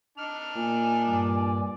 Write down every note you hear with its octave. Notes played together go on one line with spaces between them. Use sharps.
D4 D#4 A5 F6
A#2 G#5
G2 D5